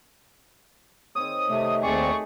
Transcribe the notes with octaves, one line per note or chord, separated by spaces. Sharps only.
D#3 C4 C#5 D#6
C3 A3 G4 D#5
D#2 A3 C4 G#4 D5 C#6